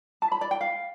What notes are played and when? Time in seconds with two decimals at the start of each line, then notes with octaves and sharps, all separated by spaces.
0.22 A5
0.32 B5
0.41 D5
0.51 G5
0.61 F5